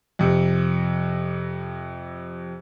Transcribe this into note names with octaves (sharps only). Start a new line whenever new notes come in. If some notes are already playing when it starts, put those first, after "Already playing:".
F2 C3